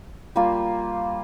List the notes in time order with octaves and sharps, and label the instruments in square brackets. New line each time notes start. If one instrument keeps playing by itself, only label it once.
[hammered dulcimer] G3 A#3 F4